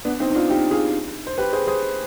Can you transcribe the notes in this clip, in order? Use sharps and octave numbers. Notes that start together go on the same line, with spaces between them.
B3 D4
C4 D#4
D#4
D4 F4
D#4 G4
F4 G#4
C5
G4 B4
G#4 C5
G#4 C5